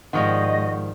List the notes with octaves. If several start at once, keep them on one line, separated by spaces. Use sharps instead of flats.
G#2 D#3 F3 G3 D#5 F#5 C#6